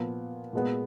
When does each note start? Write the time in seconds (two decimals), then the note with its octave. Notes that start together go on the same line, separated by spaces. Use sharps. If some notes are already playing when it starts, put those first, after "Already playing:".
Already playing: A#2 F3 B3
0.53 A#2 G#3 B3